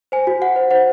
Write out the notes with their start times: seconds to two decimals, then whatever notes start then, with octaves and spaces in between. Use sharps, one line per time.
0.12 C5 G#5
0.27 F#4
0.41 F#4 F#5
0.56 C5
0.71 C5 F#5